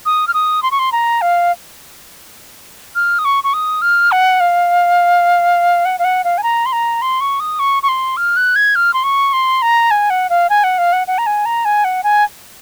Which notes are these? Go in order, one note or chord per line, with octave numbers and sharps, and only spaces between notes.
D#6
F6
D#6
C6
C#6
C6
A#5
F5
F6
D#6
C#6
C#6
D#6
F6
F#5
F5
F#5
F5
F#5
F5
G#5
A#5
C6
A#5
C6
C#6
D#6
C#6
C#6
C6
F6
F#6
G#6
F6
C6
C#6
C6
A#5
G#5
F#5
F5
G#5
F#5
F5
F#5
F#5
A#5
G#5
A#5
G#5
F#5
G#5